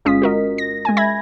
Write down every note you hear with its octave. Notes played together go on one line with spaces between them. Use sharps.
G1 G#3 C#4 F4 D#6 B6
F#4 A#4 D#5
A#6
G#3 G#5
E5 B5 G#6 A#6